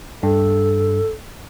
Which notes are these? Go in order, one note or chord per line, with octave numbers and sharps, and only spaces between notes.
G2 A4